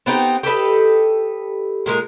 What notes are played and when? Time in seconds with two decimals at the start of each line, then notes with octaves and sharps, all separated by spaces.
0.06 B3 C4 D#4 G4
0.43 G4 A4 B4 D#5
1.86 A#2 G#3 A#4